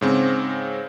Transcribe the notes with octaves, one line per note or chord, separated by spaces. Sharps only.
G#2 C#3 C4